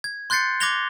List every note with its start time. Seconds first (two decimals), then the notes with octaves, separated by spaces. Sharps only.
0.04 G#6
0.30 C6 F#6 G6 A6 C7 C#7
0.60 D6 F#6 G#6 A#6 F7 G7